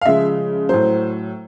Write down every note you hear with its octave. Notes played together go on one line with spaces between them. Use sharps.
F5
C#3 F3 G#3 E5
A2 F#3 C5